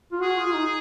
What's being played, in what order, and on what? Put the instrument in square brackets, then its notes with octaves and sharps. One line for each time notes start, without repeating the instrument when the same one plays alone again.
[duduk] F4
[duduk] F#4 [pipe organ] G#4
[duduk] F4
F4
D#4